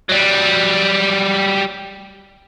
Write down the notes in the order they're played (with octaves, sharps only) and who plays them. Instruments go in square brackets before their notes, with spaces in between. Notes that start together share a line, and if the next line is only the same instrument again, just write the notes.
[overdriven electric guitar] F#3 G3